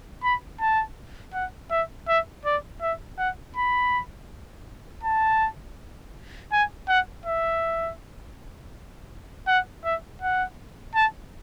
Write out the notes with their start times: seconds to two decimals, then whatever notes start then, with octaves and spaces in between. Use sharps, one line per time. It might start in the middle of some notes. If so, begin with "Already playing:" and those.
0.23 B5
0.60 A5
1.34 F#5
1.71 E5
2.08 E5
2.45 D5
2.82 E5
3.18 F#5
3.56 B5
5.03 A5
6.52 G#5
6.88 F#5
7.26 E5
9.48 F#5
9.84 E5
10.22 F#5
10.95 A5